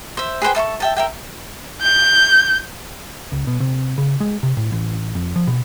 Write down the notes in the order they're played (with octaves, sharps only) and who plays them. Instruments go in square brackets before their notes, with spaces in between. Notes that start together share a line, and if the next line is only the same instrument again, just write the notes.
[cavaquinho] C5 E5
G#4 B4 C5 G5
A4 E5 C6 C#6
E5 G5 A5
A#4 E5 G5
[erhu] G6
[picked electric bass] C#2
B2
C3
C#3
G#3
C3
A2
A1
F2
F3
B2